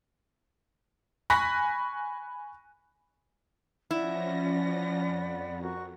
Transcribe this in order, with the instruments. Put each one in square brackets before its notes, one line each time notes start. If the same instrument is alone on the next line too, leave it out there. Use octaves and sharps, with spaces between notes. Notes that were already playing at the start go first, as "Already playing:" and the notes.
[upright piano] G#5 B5 C#6 F#6 A#6 B6
[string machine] F3 C#4 A#6 [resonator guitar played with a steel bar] E4 [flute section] D5 F#5 B5
[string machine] F2
[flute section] F#4 A#4 C#6